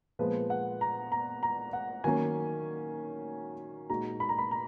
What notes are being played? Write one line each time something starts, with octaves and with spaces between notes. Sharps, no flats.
A#2 F3 G#3 B3 B4
F#5
A#5
A#5
A#5
F#5
D#3 F#3 A#3 C#4 G#5
A#2 G#3 D#4 F#4 A#5
B5
A#5
B5
A#5